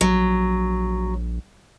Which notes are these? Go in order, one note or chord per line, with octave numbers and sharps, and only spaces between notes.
A#1 F#3